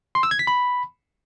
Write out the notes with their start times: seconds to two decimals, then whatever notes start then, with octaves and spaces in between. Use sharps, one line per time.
0.15 C6
0.23 E6
0.31 G#6
0.39 B6
0.47 B5